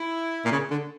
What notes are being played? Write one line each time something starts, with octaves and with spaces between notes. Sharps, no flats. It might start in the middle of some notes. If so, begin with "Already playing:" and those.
Already playing: E4
A#2
C#3
D3